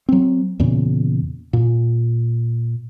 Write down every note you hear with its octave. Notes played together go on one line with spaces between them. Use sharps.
F#3 C4
E2 A#2 C#3
A#2